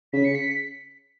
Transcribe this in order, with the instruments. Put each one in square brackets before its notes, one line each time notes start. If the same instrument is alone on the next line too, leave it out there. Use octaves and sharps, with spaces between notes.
[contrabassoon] C#3 [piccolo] B6
[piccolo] C#7
B6